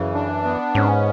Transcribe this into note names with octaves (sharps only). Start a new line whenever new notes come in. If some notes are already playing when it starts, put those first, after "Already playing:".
Already playing: F#2 C#3 E3
D4
B3
G#2 C#4